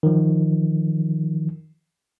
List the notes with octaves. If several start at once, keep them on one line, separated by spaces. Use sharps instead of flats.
D#3 F3